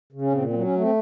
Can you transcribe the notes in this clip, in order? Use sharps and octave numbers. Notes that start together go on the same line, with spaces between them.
C#3
C#4
A#2 C4
C4
F#3
C4
C#4
A3 C4